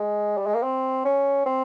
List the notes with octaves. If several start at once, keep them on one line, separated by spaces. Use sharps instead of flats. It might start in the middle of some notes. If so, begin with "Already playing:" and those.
Already playing: G#3
G3
G#3
A#3
C4
C#4
C4